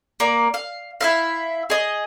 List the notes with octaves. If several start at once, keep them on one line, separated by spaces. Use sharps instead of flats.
A#3 D5
F5
E4 E5 F5
G#4 D#5